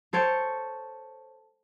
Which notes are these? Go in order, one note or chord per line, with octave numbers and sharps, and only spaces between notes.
A4 C5 C#5 G5